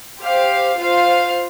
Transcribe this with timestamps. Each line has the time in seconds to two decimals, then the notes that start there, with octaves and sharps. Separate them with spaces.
0.21 G4 C5 F5
0.78 F4 C5 F5